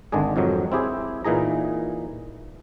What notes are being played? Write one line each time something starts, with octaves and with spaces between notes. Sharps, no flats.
G#1 D3 D#3 G#3 D4 G#4
F2 G#2 D#3 F#3
C4 E4 G4 G#4
A#2 E3 D#4 G#4 A#5